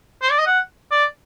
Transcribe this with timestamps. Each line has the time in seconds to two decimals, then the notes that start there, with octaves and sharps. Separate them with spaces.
0.22 C5
0.31 D5
0.39 D#5
0.46 F#5
0.91 D5